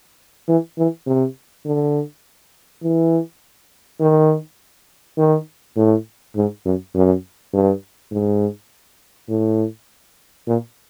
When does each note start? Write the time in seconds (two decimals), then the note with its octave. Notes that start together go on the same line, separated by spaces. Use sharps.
0.48 E3
0.78 E3
1.07 C3
1.65 D3
2.83 E3
4.00 D#3
5.18 D#3
5.77 A2
6.36 G#2
6.65 F#2
6.95 F#2
7.53 G2
8.12 G#2
9.29 A2
10.47 A#2